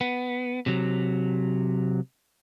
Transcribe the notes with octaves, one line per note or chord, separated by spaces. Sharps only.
B3
C3 F#3